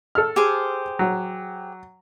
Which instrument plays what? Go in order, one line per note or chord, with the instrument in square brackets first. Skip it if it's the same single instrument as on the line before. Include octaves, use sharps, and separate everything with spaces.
[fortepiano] A4 F6
[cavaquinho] G4 G#4 C5
[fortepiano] F#3